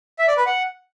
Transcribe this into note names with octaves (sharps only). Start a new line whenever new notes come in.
E5
D5
B4
F#5